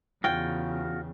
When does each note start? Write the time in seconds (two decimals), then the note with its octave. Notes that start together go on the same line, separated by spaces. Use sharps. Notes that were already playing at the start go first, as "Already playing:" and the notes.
0.24 E2 C#3 F4 F#4 G5